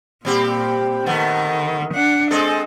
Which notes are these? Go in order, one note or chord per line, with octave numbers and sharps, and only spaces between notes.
A#2 G3 C4 G4
D#3 A3 B3
D4 F#5
G#3 C4 A4 D#5